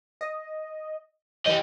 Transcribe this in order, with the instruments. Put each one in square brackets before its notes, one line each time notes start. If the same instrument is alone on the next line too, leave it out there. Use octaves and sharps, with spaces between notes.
[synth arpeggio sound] D#5
[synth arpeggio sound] E3 G6 [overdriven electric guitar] G4 D#5